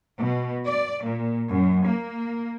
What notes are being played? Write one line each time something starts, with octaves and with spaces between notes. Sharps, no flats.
B2
D5
A#2
F#2
A#3